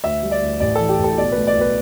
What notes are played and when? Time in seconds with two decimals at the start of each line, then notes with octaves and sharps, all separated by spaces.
0.04 D2 E5
0.23 G3
0.31 D5
0.42 D2
0.60 A1 D5
0.75 E3 A4
0.89 G4
0.99 A1
1.04 A4
1.18 B1 D5
1.32 A3 B4
1.47 D5
1.57 B1 B4